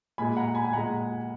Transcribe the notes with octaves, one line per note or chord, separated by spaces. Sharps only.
A#2 G#3 G#5 B5
F#5 A#5
G#5 B5
G#5
A#2 G#3 F#5 A#5